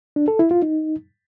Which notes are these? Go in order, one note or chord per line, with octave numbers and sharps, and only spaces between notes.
D4
A4
E4
F4
D#4